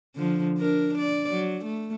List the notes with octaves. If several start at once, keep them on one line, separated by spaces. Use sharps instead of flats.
D3 F3
D4 A#4
D5
F#3
A3